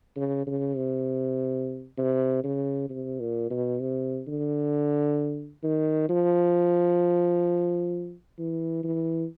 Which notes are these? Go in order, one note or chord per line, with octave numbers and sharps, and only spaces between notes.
C#3
C#3
C3
C3
C#3
C3
A#2
B2
C3
D3
D#3
F3
E3
E3